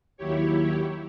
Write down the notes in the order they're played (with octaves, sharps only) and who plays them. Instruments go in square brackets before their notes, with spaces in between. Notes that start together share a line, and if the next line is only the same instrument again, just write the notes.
[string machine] D#2 F#3 E4 G4 C#5